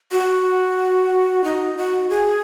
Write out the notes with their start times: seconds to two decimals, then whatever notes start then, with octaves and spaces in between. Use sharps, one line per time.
0.12 F#4
1.44 D#4
1.77 F#4
2.10 G#4